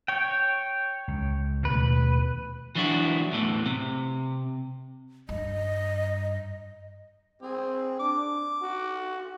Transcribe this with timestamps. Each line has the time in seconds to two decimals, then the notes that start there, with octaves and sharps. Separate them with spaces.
0.08 C#5 G5
1.08 C#2
1.65 D#2 B2 A3 B4
2.75 E3 F#3 D4 E4 F#4
3.31 E2 A2 E3
3.66 C3
5.29 G2 D#5
7.42 C4 G#4
7.99 D4 D6
8.62 F#4